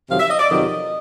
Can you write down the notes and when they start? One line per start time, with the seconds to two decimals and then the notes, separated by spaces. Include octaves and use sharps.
0.09 F2 C3 D#3 F#3 F5
0.20 E5
0.30 D#5
0.39 D5
0.50 F2 C3 D#3 F#3 D#5